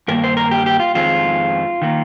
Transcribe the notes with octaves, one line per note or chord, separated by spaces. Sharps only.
G2 D#3 A#3 A#4
C5
A#4
G4
G4
F4
F2 D#3 G#3 C4 F4
D#3 A#3